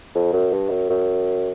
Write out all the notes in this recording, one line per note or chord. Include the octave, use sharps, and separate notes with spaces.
F2
F#2
G2
F#2
F#2